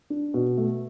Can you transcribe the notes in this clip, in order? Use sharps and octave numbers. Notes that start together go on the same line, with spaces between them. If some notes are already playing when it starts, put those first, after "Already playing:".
D4
B2
A3